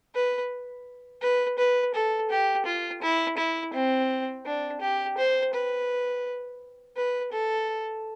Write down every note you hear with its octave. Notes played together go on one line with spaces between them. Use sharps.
B4
B4
B4
A4
G4
F4
E4
E4
C4
D4
G4
C5
B4
B4
A4